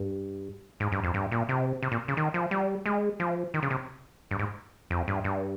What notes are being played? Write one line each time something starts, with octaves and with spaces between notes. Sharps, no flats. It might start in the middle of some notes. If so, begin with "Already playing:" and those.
Already playing: G2
G#2
G2
F2
G2
A#2
C3
C3
A#2
C#3
D#3
F3
G3
G#3
F3
D#3
C#3
C3
G2
G#2
F2
G2
G2